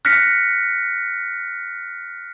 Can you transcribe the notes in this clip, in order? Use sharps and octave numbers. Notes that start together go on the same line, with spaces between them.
F6 F#6 A#6 B6 C#7